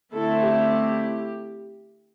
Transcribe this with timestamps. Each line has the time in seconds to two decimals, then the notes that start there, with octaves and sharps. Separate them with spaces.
0.13 D3 A3 C4 E4 A4
0.43 G4